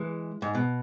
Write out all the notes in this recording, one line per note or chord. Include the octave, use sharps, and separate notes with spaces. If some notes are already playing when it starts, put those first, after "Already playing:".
Already playing: E3 G#3
G#2
B2